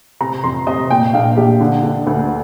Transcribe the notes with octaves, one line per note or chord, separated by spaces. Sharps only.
C3 A#5
F2 C6
C3 D#5
A#2 G5
A#1 F5
A#1 G4
D3
D3
D2